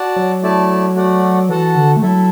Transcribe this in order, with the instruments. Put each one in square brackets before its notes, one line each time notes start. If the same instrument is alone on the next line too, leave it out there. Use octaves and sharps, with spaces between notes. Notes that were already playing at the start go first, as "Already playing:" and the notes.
Already playing: [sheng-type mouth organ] F#4 D5 F#5 A5
[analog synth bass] F#3
[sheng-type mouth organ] A3 E4 D5 A5
A3 F#4 D5 F#5
[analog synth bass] E3 [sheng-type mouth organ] F#4 A4 F#5 A5
[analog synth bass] D3
A3
[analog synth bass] F#3 [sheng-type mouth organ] E4 A4 E5